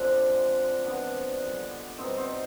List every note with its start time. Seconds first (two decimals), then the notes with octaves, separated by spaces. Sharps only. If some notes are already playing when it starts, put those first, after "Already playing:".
Already playing: D3 F3 G#3 C4 D4
0.29 D3 G#3
0.85 C3 F3 G#3 B3 D4
1.42 D3 G3
1.98 B2 G3 C4 D#4
2.17 C4 D#4